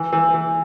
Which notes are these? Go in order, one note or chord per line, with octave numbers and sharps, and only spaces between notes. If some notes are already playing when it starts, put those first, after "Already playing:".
Already playing: E3
E3
E3